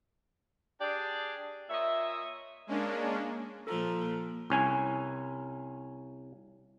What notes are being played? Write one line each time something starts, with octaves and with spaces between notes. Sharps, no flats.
D4 G4 G#4 D5
A#2 C#5 D#5 E5
G#3 A#3 C#4 D4
A#2 F3 A4 A#5
C2 C#4 G#5